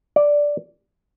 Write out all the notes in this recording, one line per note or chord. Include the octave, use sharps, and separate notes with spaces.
D5